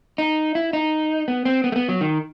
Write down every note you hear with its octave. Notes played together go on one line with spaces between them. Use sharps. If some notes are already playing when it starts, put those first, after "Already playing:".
D#4
E4
D#4
B3
C4
B3
A3
B3
F#3
D#3